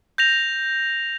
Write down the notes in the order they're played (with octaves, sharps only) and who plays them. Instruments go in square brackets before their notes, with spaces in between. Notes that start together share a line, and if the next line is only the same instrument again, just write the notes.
[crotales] G6 A#6 F7